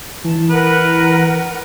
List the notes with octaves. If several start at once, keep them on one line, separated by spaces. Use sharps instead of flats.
E3 A5
A#4 B4 F#5